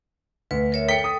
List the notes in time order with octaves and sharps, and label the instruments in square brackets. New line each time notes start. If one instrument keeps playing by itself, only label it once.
[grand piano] D2 [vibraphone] B4
[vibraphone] A#4 C#5 E5
[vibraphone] A4 G5 [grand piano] B6 C#7
[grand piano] D#6